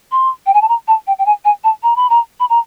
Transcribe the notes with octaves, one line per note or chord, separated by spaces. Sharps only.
C6
G5
G#5
A5
A#5
A5
G5
G5
G#5
G#5
A5
A#5
B5
A#5
B5
A#5